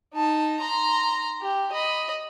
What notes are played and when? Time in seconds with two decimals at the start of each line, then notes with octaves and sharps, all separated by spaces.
0.14 D#4 A5
0.60 A#5 C6
1.41 G4
1.72 D#5 B5